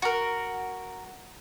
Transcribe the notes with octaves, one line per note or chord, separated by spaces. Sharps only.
F#4 A#4